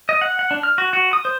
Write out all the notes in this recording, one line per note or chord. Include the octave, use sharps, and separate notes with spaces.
D#5
F#5
F#5
D4
F6
F#4
F#4
D#6
C5